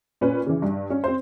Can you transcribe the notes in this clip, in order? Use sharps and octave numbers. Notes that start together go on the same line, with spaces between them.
A#2 C#4 B4
C#3 E3
G2
C#4
C4 C5